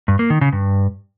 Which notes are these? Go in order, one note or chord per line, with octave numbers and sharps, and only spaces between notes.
G2
A#3
D#3
C#3
G2